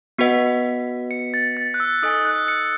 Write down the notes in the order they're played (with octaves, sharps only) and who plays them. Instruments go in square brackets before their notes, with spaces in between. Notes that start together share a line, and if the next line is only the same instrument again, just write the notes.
[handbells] B3 F#4 B4 D#5 F#5 [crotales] B6
[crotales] C#7
A6
A6
F#6
E6
[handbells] D#4 A4 D#5 G#5 [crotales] D#6
[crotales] F#6
C#7